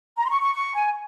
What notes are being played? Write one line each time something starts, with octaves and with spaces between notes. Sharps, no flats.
A#5
C6
C#6
C#6
C#6
G#5